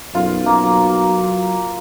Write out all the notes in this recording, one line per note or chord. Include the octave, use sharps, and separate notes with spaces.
B1 F#2 F4
F#3 A#3